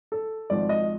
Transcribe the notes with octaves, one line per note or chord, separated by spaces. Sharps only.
A4
G#1 G#2 F3 D5
D#5